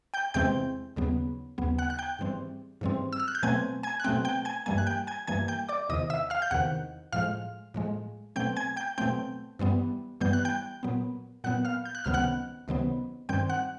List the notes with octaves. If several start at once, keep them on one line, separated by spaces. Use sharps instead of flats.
G5 G6
E2 C3 E3 G#3 C4 G5 G6
D#2 C#3 F#3 B3
D#2 C#3 F#3 B3
F#5 F#6
F#6
G5 G6
G#2 E3 G3 C4
G#2 E3 G3 C4
E6
F6
F#6
G6
B2 F#3 A3 C4 G#5 G#6
G#5 G#6
F#6
B2 F#3 A3 C4 G5 G6
G5 G6
G#5 G#6
G2 E3 G3 A#3 G#5 G#6
F#6
G5 G6
G#5 G#6
G2 E3 G3 A#3 G#5 G#6
G5 G6
D5 D6
E2 C3 D#3 D#5 D#6
E5 E6
F5 F6
G6
E2 C3 D#3 F#5 F#6
A2 F3 G#3 F5 F6
A2 F3 G#3
B2 F#3 A3 C4 G5 G6
G#5 G#6
G5 G6
B2 F#3 A3 C4 G5 G6
G2 E3 G3 B3
G2 E3 G3 B3 G6
F#6
G5 G6
A#2 F#3 B3
A#2 F#3 B3 F#5 F#6
F5 F6
G6
F#6
C#2 C3 D#3 F#3 B3 F6
F#5 F#6
C#2 C3 D#3 F#3 B3
G2 D#3 G3 C4 G5 G6
F#5 F#6